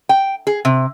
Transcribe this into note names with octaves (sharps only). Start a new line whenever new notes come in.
G5
G#4
C3